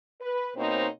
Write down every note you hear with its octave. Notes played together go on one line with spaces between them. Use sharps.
B4
B2 A#3 C4 D#4 C5 C#5